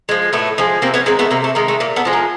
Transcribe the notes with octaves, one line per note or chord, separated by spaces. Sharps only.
F3 G#3
A2 A3 B3
F3 G#3
C3 A#3 C4
B3 C#4
D#3 G#3 A#3 C4
A3 B3
C3 A#3
A3
D#3 G#3 A#3
A3
A#2 A#3
A3 B3
F3 G#3
A#3